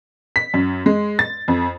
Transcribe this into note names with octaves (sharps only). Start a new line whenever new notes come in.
B6
F#2
G#3
A6
F2